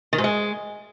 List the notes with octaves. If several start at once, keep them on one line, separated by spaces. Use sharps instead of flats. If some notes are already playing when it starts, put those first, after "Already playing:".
D#3
G#2
G#3